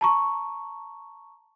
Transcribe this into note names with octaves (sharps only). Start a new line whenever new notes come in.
A5 A#5 C#6